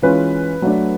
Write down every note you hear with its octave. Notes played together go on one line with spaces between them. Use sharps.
E3 G#3 C#4 F4 B4
F#3 A3 D4